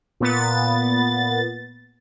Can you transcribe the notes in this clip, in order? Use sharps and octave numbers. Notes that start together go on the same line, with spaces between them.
A#2 B3 A6